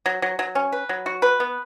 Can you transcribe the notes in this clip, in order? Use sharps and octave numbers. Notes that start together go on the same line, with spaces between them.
F#3
F#3
F#3
C#4
B4
F#3
F#4
B4
B3